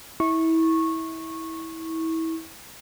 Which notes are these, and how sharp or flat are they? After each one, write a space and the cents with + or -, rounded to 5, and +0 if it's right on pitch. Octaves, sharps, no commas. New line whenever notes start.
E4 -25 C#6 -15